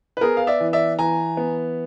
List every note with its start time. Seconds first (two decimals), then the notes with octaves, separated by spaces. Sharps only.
0.17 B4
0.21 B3 G#4 A#4
0.37 F5
0.47 D5 E5
0.60 E3
0.73 D5 E5
0.99 E3 G#5 A#5
1.37 B3